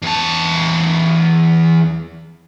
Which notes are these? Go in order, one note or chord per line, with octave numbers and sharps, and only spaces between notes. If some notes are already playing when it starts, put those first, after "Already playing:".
E2 A5